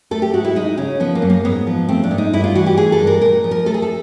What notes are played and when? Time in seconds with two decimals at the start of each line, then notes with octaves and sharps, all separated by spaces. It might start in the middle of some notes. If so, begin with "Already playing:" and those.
0.11 A3 A4
0.22 G4
0.33 G#2 F#4
0.45 E4
0.56 G#3 D#4
0.78 C#3 C#4
1.00 F3 B3
1.15 A#3
1.22 F#2
1.30 A#3
1.45 G#2 B3
1.67 F3
1.89 A3 C4
2.04 D4
2.11 G#2
2.18 D#4
2.33 G2 E4
2.44 F4
2.55 E3 F#4
2.66 G4
2.77 A3 G#4
2.92 A4
3.00 G2
3.07 A#4
3.21 A#2 A#4
3.44 F3
3.51 A#4
3.66 A3 A4
3.74 G#4
3.82 A4